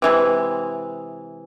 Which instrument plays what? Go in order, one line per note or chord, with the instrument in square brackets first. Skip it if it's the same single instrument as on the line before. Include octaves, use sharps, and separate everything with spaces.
[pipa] C3 E3 G#3